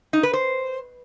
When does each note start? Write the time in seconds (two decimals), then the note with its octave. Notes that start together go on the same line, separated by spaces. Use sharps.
0.13 D#4
0.23 B4
0.33 C5